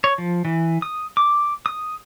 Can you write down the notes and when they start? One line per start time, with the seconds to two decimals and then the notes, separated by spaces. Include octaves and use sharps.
0.04 C#5
0.18 F3
0.45 E3
0.82 D#6
1.17 D6
1.66 D#6